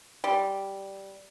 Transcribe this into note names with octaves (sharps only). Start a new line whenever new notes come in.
G3